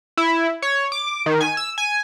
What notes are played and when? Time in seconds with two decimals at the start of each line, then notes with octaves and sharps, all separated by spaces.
0.17 E4
0.62 C#5
0.92 D6
1.26 D#3
1.41 G#5
1.57 E6
1.78 G#5